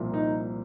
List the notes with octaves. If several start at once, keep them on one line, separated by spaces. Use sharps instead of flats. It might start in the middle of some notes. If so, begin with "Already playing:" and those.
Already playing: C2 A#2 F3
D#4